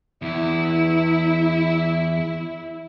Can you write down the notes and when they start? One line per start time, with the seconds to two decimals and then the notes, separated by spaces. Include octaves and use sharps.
0.22 E2 E4